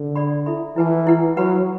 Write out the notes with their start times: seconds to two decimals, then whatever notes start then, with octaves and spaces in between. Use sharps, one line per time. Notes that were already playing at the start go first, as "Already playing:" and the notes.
Already playing: D3
0.16 A4 D5 F#5 B5
0.46 E4 A4 E5 B5
0.76 E3 E4 B4 F#5 A5
1.07 E4 B4 F#5
1.37 F#3 B4 F#5 B5